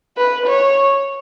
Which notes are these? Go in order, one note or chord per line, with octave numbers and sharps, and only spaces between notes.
B4
C#5